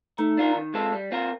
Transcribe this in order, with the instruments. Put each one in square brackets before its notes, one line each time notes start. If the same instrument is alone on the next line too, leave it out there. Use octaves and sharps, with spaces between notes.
[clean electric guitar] A3 [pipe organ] D#4
[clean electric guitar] D4 F4 A#4
D#3
G#3 C4 F4 A4
G3
C4 F4 A#4